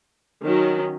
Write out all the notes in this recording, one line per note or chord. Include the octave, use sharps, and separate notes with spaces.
D#3 F#3 C#4